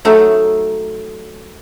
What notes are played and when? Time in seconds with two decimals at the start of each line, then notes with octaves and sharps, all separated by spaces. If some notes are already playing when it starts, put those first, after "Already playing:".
0.05 F#3 A3 D#4